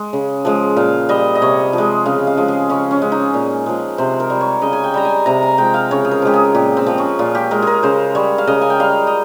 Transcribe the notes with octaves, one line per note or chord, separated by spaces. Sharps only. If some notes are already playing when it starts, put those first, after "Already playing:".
Already playing: G#3
C#3
F3 G#3
A#2 F5
G3 D#5
D#5
C3 C#5
F3 G#3
C#3 F5
F5
F3 G#3
G#4
C#3 C#4
C#4
G#3
D#4
A#2
F3 G#3
C3 C5
A#4
G3
C#5
C#3 D#5
G#5
G5
G3 A#5
G#5
C3 A#5
G#5
F3 G#3 G5
F5
C#3 C#5
G#4
A#4
F3 G#3 G4
G#4
A#2 G4
C4
F3 G#3
C#4
A#2 F4
G4
G#3 A#4
G#4 A#4
C#3 C5
G3 C#5
F5
C#3 D#5
G#5
G5
G3 F5
D#5